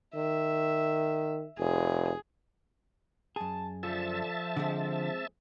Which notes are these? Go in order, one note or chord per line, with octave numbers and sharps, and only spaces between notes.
D#3 E5
F1 G#4
F#2 G#4 A5
D3 F3 E5 A5
D3 G#3 C4 G#4